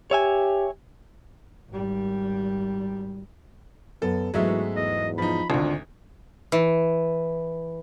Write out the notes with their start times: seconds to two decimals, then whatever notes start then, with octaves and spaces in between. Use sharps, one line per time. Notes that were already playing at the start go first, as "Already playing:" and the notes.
0.11 G4 C#5 E5 G#5
1.70 G#1 G3
4.02 F#2 B3 A4
4.34 G#2 E3 F#3 G#3 A3 B3 F#4 E5
4.76 E2 D#5
5.18 F3 D#4 B5
5.50 G#1 D2 D4 F4
6.52 E3